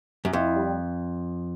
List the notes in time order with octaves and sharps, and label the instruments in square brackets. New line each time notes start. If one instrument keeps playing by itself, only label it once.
[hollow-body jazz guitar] F#2
[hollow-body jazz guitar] F2 [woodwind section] E4
[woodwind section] G3